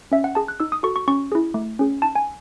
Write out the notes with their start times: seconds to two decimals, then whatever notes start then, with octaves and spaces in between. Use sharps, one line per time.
0.12 C#4 E5
0.24 F#5
0.35 G#4 A5
0.48 F#6
0.60 D#4 E6
0.72 D#6
0.83 F#4 A4 C#6
0.96 C#6
1.08 C#4 C#6
1.32 E4 G#4
1.54 A3
1.79 C#4 G#4
2.02 D#4 A5
2.15 G#5